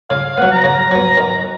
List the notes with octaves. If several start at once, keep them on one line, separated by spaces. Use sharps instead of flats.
C#3 F5
F5
F#3 B3 F#5
A#5
C#3
F#3 B3
D#3